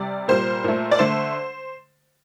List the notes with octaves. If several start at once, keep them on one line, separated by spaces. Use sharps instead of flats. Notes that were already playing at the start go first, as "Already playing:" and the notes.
Already playing: C3 G3 D5
A#2 G3 A#3 C5
A#2 A3
D5
D3 A3 C5